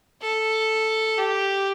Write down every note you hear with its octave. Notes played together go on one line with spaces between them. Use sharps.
A4
G4